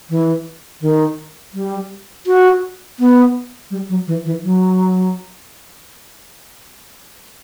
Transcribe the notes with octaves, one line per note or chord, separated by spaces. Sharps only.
E3
D#3
G3
F#4
B3
G3
F#3
E3
E3
F#3